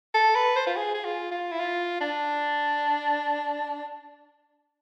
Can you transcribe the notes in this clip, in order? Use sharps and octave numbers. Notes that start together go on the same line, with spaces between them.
A4
B4
C5
F4
G#4
G#4
F4
F4
E4
F4
D4